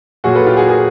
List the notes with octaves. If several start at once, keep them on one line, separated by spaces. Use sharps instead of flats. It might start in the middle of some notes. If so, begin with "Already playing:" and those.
A#2 F#3 F#4 G#4
A4 B4
F4 G4
F#4 G#4
G#4 A#4